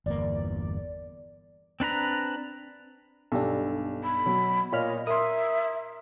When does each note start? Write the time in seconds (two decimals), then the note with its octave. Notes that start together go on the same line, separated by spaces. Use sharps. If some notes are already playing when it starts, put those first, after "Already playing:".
0.06 G1 E2 A#3 D5
1.80 C4 D4 B4 A#5
3.32 B1 G2 D4 G4 A4
4.04 B5
4.26 B2 F#3
4.72 A#2 F4 C#5 D#5 B5 F6
5.07 A#4 E5 C6 D#6